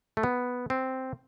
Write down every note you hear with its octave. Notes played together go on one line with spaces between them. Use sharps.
A3
B3
C4